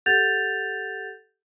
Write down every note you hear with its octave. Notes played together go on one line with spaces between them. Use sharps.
G4 A4 F#5 G6 A6 F7